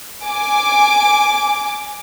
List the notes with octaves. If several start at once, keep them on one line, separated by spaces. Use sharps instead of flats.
G#5 D6